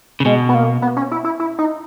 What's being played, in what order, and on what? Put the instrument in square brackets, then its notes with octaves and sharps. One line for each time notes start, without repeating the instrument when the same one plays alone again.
[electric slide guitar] C#3
[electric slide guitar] B2 [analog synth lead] G#3
[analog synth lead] B3
A#3
B3
C#4
E4
E4
E4
D#4